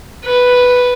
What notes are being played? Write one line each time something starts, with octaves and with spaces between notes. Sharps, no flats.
B4